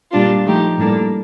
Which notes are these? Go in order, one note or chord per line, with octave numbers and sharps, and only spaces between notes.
A#2 G3 D4 F4
F3 A3 D#4 G4
A2 G3 A#3 D4 A4